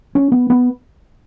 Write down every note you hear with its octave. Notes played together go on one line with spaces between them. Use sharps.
C#4
B3
B3